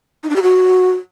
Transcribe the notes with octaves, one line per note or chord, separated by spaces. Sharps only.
D#4
D4
G4
F#4